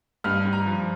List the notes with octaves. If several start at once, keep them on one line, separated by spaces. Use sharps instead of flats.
G2 F6
G2
A#5
F3